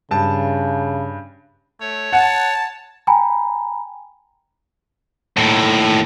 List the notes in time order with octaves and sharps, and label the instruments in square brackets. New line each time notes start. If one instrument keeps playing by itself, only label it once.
[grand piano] G2 A5 [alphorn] C#3
[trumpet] A3 [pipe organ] C#5
[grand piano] F#5 [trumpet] A5
[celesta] G5 G#5 A#5 B5
[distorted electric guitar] D#2 A2